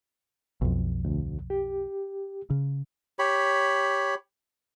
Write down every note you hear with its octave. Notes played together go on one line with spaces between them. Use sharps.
B1 F2
D2
G4
C#3
G4 C#5 B5